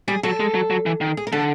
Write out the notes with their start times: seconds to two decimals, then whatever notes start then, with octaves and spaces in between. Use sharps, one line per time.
0.08 G3 G#4
0.23 F#3 A4
0.40 G#3
0.55 F#3
0.70 F#3
0.86 E3
1.01 D#3
1.17 G#4
1.27 A#4
1.32 D3 A4